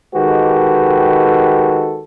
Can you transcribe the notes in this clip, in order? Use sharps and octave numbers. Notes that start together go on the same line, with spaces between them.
D#3 G#3 F#4 G4 A4 B4